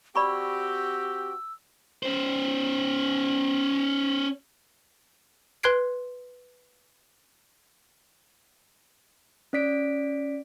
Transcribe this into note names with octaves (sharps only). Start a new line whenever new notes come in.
C4 F#4 G4 D5 B5 C#6 E6
C#4 C5
B4 C6 F#6 G#6 C7 D7
C#4 D5 B6 D7